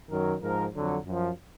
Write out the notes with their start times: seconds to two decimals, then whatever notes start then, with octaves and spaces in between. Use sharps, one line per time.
0.10 F#2 D#3 F#3 A#4
0.42 G#2 F3 A#4
0.73 F2 D3 F#3
1.06 F#2 F3